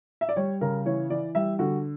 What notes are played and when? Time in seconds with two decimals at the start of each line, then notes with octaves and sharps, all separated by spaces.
0.21 E5
0.29 D5
0.36 G3 C#5
0.61 C#3 A#4
0.86 E3 C#5
1.10 E3 D5
1.35 G3 E5
1.59 D3 F#4